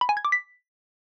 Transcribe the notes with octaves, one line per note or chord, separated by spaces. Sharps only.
B5
G#5
G#6
D6
B6